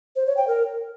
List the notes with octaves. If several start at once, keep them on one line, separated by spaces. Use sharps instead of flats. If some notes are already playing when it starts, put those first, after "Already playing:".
C5
C#5
G5
A#4